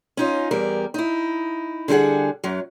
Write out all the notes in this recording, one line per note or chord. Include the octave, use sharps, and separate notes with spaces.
C#4 D#4 F4
E2 G3 A#4
D#4 E4
D3 G3 E4 G#4 F#5
F#2 F#3